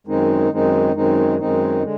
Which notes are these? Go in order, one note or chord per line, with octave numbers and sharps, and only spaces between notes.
F#2 D#3 G#3 C4 D#4
F#2 D#3 G#3 C4 D#4
F#2 D#3 G#3 C4 D#4
F#2 D#3 G#3 C4 D#4
D3 G#3